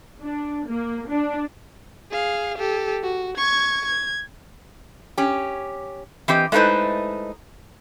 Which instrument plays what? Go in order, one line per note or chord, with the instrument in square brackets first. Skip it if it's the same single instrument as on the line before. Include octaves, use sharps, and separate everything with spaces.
[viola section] D4
A#3
D4
[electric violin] G#4 F5
G4 A4
F#4
C#6 G#6
G#6
[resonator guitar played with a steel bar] C#4 G4
E3 C4 G4 D#5
G#3 A3 D#4 E4 B4 C5